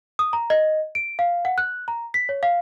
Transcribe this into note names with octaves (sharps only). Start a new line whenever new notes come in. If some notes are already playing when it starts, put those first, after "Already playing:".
D#6
A#5
D#5
D7
F5
F#5
F#6
A#5
B6
C#5
F5